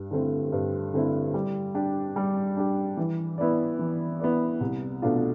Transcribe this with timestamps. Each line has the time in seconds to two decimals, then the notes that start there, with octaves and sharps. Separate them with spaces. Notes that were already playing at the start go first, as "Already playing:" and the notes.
Already playing: G2
0.11 D3 A3 C4 E4
0.52 G2
0.94 D3 A3 C4 E4
1.34 G3
1.75 D4 G4
2.16 G3
2.57 D4 G4
2.97 E3
3.38 B3 E4 B4 D5
3.79 E3
4.20 B3 E4 B4 D5
4.61 C2
5.02 B2 A3 D4 F4